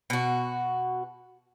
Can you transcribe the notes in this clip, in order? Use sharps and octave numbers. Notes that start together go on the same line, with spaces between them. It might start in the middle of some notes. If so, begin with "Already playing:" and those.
B2 F#4